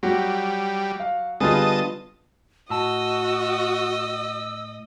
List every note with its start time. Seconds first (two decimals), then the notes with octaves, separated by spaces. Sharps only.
0.03 F#3 G3
1.00 F5
1.41 D3 G3 B3 F4 G#4 D#5 A5
2.70 A2 F#4 D#5 A5 E6